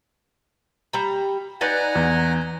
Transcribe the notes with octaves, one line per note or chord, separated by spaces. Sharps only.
G3 A#5
D#4 B4 D5 F#5 G#5 A#5
E2